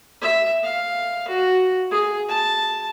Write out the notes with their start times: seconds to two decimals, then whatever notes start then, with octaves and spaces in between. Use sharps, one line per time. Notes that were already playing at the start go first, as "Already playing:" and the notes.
0.22 E5
0.63 F5
1.28 F#4
1.91 G#4
2.29 A5